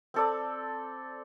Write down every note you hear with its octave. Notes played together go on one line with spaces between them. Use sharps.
C4 A4 D5